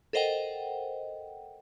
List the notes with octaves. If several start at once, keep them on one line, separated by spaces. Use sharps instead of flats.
A4 A#4 C5 D#5 F#5 G5